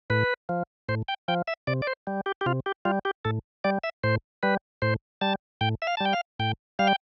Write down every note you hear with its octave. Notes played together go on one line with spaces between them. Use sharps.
A2 B4
F3
A2 C5
G5
F3 G5
E5
C3 D5
D5
C5
G3
G4
G4
C3 F4
G4
G3 F4
G4
A2 A4
G3 D5
E5
A2 C5
G3 B4
A2 C5
G3 A5
A2 G5
E5
F5
A5
G3 G5
F5
A2 G5
G3 F5
G5